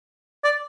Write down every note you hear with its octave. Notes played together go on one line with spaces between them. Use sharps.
D5